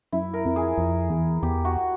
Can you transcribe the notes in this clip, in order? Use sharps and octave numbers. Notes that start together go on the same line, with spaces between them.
F#2 E4
A#4
F2
G#4
F2
E2
E2 G4
F#4